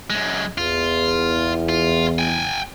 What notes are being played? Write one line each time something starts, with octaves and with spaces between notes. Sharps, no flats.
F#2 G#3
E2 F4
F4
G5 G#5